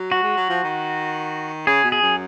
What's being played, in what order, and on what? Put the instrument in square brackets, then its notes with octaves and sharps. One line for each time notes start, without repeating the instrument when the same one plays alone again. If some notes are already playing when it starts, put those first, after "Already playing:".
Already playing: [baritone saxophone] F#3
[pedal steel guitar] F#4
[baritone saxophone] G#3
F#3
F3
D#3
[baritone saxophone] C#3 [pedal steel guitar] G#4
[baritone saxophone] B2
[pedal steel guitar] G#4
[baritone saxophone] F#2